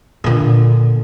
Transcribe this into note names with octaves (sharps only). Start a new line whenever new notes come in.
A#2 D3